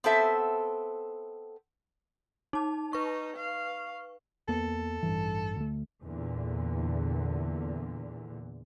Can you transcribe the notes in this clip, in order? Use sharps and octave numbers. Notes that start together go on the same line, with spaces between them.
B3 C4 A4 E5
D#4 A5
D#4 B4 C#6
F5
E2 A#3 B3 A4
A1 G2 E3
D2 A3
E2 A#2 D3